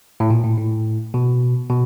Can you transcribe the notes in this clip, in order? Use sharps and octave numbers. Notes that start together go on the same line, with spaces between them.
A2
A#2
A2
A2
B2
B2